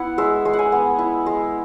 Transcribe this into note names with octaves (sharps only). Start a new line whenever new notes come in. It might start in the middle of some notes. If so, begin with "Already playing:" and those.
Already playing: B3 E4 F#5
G#3 E5
G#3
F#5
G#5
B3
E4
G#3